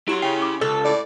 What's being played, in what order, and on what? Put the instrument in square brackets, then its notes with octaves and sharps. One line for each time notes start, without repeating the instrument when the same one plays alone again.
[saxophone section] F#3 [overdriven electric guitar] E4 C6 [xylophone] G4 E7
[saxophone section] C#3 [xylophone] G5
[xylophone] D6
[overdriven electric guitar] C#2 [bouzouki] A4
[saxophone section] A2 D5